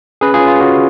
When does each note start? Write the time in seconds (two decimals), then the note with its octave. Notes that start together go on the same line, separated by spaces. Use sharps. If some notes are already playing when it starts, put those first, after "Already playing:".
0.21 C#4 G#4 B4
0.34 F4 G#4
0.40 C#4
0.47 F4
0.60 C#4 F#4